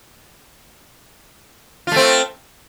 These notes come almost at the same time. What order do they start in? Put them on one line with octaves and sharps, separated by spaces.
F4 A3 C4